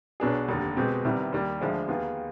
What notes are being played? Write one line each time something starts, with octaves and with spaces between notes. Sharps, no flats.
B1 B2 B3 D4 G#4
F1 D#2 D3
B2 G#3 C4 G4
C2 C3 D#3 G3 B3
D#2 D#3 G3
D2 D3 F3 G#3 D4
D#2 D#3 B3 F4 G#4